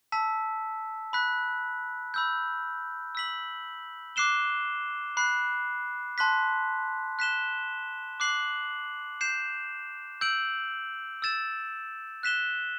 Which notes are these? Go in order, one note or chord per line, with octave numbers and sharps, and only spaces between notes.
A5 E6 B6
B5 F#6 B6
B5 E6 G6
E6 B6 F#7
D6 F#6 C7 E7 G7
B5 F#6 C7
A5 C6 F#6 B6
F#6 B6 E7 G7
D6 F#6 C7 F#7
G6 C7 E7
E6 G6 D7 F#7
E6 A6 E7
F#6 B6 E7 G7